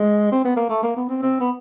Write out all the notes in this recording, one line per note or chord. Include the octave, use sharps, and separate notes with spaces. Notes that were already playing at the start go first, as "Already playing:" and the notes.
Already playing: G#3
C4
B3
A#3
A3
A#3
B3
C4
C4
B3